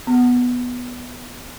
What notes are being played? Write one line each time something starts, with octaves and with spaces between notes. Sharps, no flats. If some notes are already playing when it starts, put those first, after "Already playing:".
B3